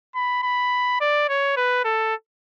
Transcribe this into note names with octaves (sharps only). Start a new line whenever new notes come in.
B5
B5
D5
C#5
B4
A4